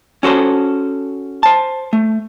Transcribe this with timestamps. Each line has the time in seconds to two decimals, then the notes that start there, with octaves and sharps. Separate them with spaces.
0.23 C#4 F#4 A4 C5
1.43 C5 A5
1.93 A3